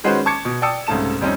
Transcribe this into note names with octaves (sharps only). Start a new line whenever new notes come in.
D#3 G#3 C#4 F#4 B4 C5
A5 C#6 D6 G#6 C#7
B2
D5 G5 A5 D#6 E6 C#7
C2 G#2 C#3 A3 A5 E7
F2 G3 C4 C#4 D#4